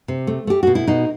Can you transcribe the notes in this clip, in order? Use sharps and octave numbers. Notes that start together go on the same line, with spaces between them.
C3
A3
A3 G4
B2 F#4
E4
B2 D#4